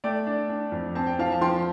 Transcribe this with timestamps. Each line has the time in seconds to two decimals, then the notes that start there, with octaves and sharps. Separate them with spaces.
0.04 A3 D5 G5
0.27 D4
0.49 D4
0.72 F2
0.95 C4 A5
1.07 G5
1.19 F3 F5 A5
1.32 A5
1.41 F3 G5 C6